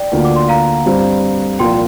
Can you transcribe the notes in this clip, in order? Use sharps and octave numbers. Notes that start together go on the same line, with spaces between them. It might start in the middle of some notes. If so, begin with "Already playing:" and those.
Already playing: D5 G5
D2 D3 A#3 F4
D6
C6
F5 A#5
G2 G3 C4
C2 A#2 F3 A#3 F4 G5 C6